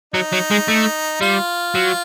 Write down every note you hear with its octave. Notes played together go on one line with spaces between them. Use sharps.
F#3 D#4
F#3
G#3
A3
G3 F4
F#3